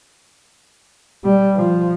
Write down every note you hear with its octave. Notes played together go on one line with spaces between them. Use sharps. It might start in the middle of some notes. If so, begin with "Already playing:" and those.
G3
F3